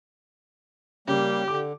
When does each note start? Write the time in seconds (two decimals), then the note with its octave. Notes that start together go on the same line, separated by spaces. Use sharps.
1.08 C#3 G3 A#3 G4
1.48 D3 D6